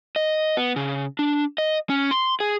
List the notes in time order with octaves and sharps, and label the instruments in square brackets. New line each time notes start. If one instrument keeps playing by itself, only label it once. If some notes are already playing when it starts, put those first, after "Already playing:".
[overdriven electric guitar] D#5
B3
C#3
D4
D#5
C#4
C6
G#4